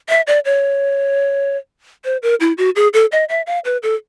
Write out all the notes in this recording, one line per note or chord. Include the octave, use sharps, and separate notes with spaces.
E5
D5
C#5
C5
A#4
E4
F#4
G#4
A4
D#5
E5
F5
B4
A4